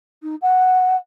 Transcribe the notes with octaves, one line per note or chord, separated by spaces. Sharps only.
D#4
F#5